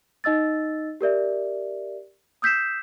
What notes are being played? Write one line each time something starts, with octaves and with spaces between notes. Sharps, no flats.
D#4 D#5 E6 A6
G4 A#4 D5 E5
D#6 E6 G6 B6 C7 E7